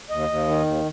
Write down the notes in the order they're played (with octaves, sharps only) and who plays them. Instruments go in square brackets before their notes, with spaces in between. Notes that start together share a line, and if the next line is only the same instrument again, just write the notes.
[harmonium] D#2 D#5
D#2
D#3
D#2